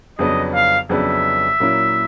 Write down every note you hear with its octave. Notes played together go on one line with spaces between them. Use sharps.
F2 C#3 F#3 B3 D4 D#5
F5
F2 C#3 F#3 B3 D4 E5
A#2 F#3 A#3 C#4 E4